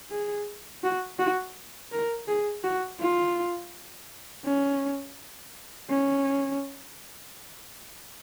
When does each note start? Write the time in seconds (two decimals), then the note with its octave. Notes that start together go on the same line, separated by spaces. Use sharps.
0.11 G#4
0.83 F#4
1.19 F#4
1.92 A#4
2.28 G#4
2.63 F#4
3.00 F4
4.45 C#4
5.89 C#4